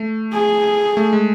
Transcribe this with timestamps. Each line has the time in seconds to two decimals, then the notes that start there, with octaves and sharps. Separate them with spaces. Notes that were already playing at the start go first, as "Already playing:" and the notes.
Already playing: A3
0.33 G#4
0.97 A3
1.13 G#3